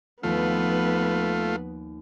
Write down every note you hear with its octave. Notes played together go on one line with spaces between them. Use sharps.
D#2 F3 A3 B3 F4 B4